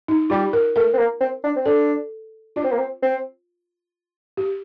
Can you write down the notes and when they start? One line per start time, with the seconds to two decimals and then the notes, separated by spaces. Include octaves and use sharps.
0.08 D#4
0.30 G3 F4
0.53 A#4
0.76 A3 A#4
0.93 C4
0.98 A#3
1.21 C4
1.44 D4
1.56 C4
1.66 D4 A4
2.56 D4 F4
2.64 C4
2.72 A#3
2.79 C4
3.02 C4
4.37 G4